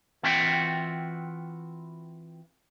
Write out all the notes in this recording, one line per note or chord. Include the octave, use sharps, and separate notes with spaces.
E3 C4 F4 F#4 E5 G5